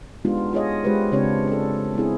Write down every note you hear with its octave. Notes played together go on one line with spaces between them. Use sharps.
G#3 B3 D4 D#4 F4 G4
F4 G#4 C#5 D#5
G#3 F4 G4 B4 C5
C#3 C4 D4 G4 C#5
D4 A4
B3 C4 E4 G#4